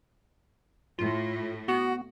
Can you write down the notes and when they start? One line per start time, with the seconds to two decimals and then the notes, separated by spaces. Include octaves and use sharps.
0.99 A2 F4
1.68 B3 F#4